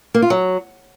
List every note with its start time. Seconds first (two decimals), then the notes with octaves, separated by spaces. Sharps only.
0.14 A#3
0.22 F4
0.30 F#3